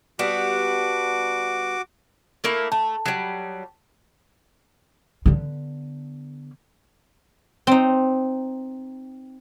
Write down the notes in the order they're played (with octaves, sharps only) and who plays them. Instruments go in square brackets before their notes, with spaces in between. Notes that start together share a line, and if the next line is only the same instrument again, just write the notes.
[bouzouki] G3 B3 D4 [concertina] F#4 D6
[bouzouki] A3 A#3 E4
[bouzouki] A3 [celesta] A5
[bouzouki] F#3 G3
[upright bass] D3 B3
[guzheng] C4 D#4